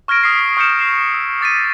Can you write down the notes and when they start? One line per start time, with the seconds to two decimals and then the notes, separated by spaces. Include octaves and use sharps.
0.08 C#6 F6 G#6 A#6 D7
0.23 D#6 B6 C7
0.57 C#6 F6 G6 C#7 E7
0.79 F6 C7 E7
1.14 E6
1.41 D6 A6 B6 D#7